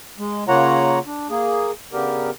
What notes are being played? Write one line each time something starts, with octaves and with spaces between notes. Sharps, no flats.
G#3
C#3 A#3 F4 C#5 F#5 A#5
D4
A#3 G#4
C#3 B3 D4 G4 A#4